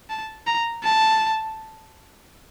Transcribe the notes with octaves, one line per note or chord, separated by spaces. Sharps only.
A5
A#5
A5